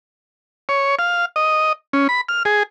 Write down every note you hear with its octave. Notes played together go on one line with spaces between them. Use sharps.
C#5
F5
D#5
C#4
B5
F6
G#4